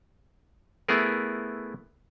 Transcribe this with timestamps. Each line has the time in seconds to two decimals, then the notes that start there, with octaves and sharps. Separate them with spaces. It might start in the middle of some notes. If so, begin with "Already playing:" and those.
0.88 A3 B3 E4 G#4 A#4